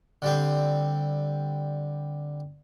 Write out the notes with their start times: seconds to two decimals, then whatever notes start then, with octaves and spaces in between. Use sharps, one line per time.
0.22 D3 G3 C4